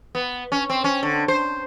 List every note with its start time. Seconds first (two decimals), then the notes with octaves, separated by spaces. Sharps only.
0.15 B3
0.52 C#4
0.70 C4
0.84 C#4
1.03 D3
1.28 C5